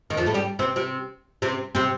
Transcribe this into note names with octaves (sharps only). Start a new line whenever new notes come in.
D#2 D#3
F2 F3
A2 A3
G3 G4
C3 C4
C3 C4
C3 C4
C3 C4